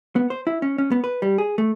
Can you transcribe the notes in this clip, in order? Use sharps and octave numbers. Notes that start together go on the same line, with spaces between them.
B3
C5
E4
C#4
C#4
B3
B4
G3
G#4
A3